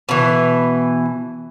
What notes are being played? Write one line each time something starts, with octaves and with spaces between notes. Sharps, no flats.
B2 E3